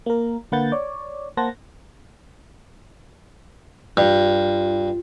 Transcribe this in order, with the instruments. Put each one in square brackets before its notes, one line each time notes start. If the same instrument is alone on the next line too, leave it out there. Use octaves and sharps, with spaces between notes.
[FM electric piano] A#3 A#4
D3 A#3 B4 F#5 G6 A6
C#5 D5
A#3 C5 F#5 A5 A#6
[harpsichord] G2 [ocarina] F4